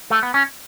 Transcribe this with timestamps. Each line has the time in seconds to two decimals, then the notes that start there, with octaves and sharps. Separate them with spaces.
0.10 A3
0.23 B3
0.34 C#4